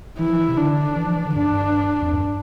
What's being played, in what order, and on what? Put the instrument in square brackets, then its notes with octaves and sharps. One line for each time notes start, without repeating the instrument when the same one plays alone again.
[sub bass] E3 [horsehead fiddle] E4
[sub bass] F3
E3
C3
[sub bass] D3 [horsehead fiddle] D4
[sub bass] E3
F3
E3
D3
[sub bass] G2 [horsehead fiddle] D4
[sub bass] F2
G2